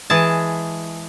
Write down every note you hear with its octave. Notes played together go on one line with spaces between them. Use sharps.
E3 G#3 G#4 A5